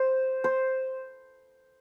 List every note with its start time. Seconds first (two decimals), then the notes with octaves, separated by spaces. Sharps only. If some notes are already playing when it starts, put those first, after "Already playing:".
Already playing: C5
0.44 C5